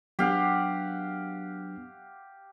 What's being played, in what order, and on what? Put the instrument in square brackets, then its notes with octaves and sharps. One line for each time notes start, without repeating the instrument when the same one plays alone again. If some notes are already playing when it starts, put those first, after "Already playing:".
[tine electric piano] F#3 B3 D4 [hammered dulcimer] G4 F5 F#5